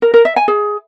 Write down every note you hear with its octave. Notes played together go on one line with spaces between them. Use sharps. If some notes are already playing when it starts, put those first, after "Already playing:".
A#4
A#4
E5
G#5
G#4